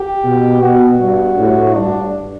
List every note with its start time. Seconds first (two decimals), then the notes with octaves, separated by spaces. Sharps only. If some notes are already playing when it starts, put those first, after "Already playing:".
Already playing: G4
0.24 B2
0.61 B2 F#4
1.00 G2
1.38 A2
1.75 G2 D4